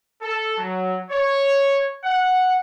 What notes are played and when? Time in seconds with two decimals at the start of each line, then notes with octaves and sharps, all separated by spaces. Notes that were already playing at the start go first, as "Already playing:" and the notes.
0.22 A4
0.58 F#3
1.10 C#5
2.04 F#5